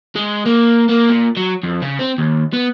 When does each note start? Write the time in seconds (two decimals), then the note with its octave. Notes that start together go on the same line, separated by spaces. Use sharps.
0.16 G#3
0.46 A#3
0.89 A#3
1.09 A#2
1.37 F#3
1.63 F2
1.82 C#3
1.99 C4
2.18 D#2
2.53 B3